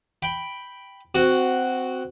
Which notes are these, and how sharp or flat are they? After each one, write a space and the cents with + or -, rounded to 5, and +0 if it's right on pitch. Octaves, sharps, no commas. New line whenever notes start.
G5 +0 B5 +0
C4 -15 F#4 +0